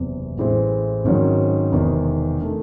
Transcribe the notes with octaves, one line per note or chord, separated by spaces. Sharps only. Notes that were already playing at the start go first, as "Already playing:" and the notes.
Already playing: F#1 E2 C3
A1 A2 E3 G#3 C4
G#1 G#2 D#3 F#3 C#4
E1 E2 C3 D#3
D#3 A3